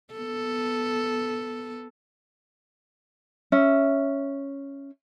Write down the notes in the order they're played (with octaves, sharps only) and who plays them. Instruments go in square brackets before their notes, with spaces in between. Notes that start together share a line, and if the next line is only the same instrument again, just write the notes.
[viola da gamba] B3 A4
[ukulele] C#4 E5